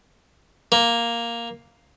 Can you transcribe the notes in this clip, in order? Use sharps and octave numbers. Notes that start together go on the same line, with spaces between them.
A#3